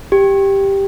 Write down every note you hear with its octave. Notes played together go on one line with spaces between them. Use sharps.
G4